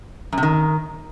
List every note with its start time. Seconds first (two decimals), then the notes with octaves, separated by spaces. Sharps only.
0.32 F#2
0.38 C3
0.43 D#3